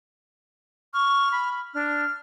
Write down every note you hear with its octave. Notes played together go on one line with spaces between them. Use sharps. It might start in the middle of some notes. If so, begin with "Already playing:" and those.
C#6 F6
B5
D4 F6